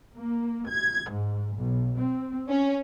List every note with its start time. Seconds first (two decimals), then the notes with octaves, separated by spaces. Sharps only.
0.17 A#3
0.68 G#6
1.11 G#2
1.57 B1
1.97 C4
2.48 C#4